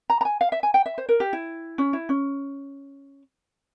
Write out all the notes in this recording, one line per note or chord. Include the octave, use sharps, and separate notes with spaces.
A#5
A#5
G#5
F5
E5
G#5
G5
E5
C5
A#4
G4
E4
C#4
E4
C#4